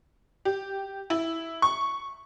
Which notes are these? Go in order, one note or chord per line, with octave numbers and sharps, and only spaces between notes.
G4
E4
C#6